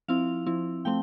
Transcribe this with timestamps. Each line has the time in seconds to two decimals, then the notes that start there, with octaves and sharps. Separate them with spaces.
0.08 F3 C4 E4 F5
0.46 F3 C4 E4
0.85 F3 A3 C4 G5